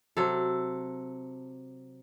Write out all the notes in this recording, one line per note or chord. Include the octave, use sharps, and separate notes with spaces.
C3 F#3 A4